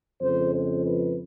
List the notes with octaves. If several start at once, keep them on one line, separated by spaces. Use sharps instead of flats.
F2 C#3 F3 G#3 C5
C5
B4